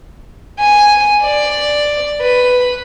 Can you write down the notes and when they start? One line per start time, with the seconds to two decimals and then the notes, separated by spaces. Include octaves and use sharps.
0.60 G#5
1.24 D5
2.21 B4